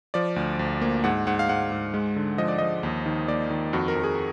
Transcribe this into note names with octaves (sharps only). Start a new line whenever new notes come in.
F3 D5
D2
D2
A#3
G#2 F#5
G#2 F#5
F5
G#2 F#5
G#2
G#3
D3
F3 D#5
D5
F3 D#5
D#2
D#3
A#3 D5
D#3
F2 F#4
A#4
F2
G#4